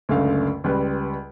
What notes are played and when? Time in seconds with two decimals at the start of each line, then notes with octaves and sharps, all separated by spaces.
0.09 C#2 F#2 D3 A3 F5
0.64 C#2 G3 B4